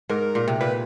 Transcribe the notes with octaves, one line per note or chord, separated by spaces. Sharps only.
G#2 A#4
A#2
C3
A#2 B4